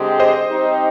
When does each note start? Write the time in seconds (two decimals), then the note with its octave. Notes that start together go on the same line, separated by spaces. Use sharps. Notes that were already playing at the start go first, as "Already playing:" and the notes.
Already playing: D3 G#3 C4 G4
0.20 C5 D#5
0.50 G3 C4 D#4 G4